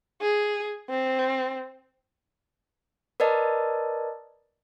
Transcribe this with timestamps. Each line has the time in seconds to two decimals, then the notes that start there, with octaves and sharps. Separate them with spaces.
0.21 G#4
0.89 C4
3.20 A#4 B4 D5 D#5 A5